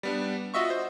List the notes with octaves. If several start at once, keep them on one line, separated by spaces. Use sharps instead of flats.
G3 B3 D4
F4 F#4 D#5 E5 C#6
C5